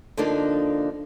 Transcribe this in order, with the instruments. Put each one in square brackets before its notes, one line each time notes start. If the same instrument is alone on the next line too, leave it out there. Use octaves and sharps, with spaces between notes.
[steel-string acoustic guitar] D3 F3 A#3 D4 D#4